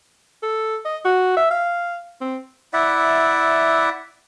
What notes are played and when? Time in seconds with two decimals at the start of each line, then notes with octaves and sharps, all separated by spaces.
0.43 A4
0.85 D#5
1.05 F#4
1.37 E5
1.51 F5
2.21 C4
2.73 E4 D5 E5 F#5